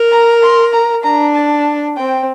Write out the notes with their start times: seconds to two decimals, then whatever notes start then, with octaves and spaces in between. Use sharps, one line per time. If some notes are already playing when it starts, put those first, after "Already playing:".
Already playing: A#4
0.12 A#5
0.42 C6
0.73 A#5
1.04 D4 A#5
1.35 A5
1.97 C4 G5